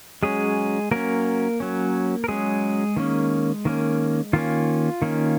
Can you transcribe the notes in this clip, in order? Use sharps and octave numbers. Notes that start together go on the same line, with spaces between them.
F#3 G#3 C#4 G#4
F#3 A#3 C#4 A#4
F#3 C#4
A#4
F#3 G#3 C#4 G#4
D#3 A#3 C#4
D#3 A#3 C#4
D#3 A#3 C#4 F4
D#3 A#3 C#4